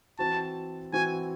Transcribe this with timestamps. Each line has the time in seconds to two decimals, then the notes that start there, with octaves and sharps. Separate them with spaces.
0.19 E3 C4 F#4 A5
0.93 E3 C4 F#4 G#5